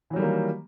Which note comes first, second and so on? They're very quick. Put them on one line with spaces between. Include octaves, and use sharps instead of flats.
E3 F#3 G3 D#3 A#3